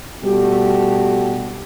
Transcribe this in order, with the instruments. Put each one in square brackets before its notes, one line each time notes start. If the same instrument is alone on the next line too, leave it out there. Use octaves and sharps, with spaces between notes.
[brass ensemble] B2 G3 A3 D4 F#4 G4